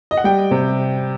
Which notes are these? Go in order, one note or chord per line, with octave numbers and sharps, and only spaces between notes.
D#5
F#5
G3 G5
C3